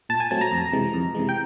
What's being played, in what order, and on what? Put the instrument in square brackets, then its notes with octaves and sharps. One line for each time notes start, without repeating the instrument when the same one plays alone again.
[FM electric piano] A#2 A5
G#5
F#3 A3 C4 A5
A#5
F2
C3 E3 G#3
F2
C3 E3 G#3
G5